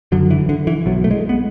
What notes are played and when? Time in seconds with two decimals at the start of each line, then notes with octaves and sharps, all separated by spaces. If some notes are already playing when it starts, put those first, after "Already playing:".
0.12 F#1 F#2 D3 F#3
0.31 E3
0.49 D3
0.67 E3
0.86 B1 B2 F#3
1.04 A3
1.11 G#3
1.29 B3